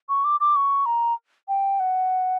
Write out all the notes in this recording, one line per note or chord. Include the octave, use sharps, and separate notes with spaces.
C#6
D6
D6
C#6
A#5
G5
F#5